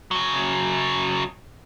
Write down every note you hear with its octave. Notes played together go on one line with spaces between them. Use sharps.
C#3 F#3